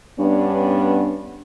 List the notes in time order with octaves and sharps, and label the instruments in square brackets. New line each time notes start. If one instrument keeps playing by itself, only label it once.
[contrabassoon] G2 [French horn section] B3 C#4 D4